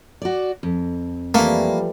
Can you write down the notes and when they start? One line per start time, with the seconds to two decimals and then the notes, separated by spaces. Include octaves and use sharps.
0.22 F#4 D5
0.63 F2
1.34 E3 F3 G3 A3 A#3